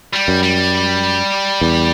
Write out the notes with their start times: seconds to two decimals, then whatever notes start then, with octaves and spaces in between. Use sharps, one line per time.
0.13 G3
0.28 F#2
0.43 G3
1.61 E2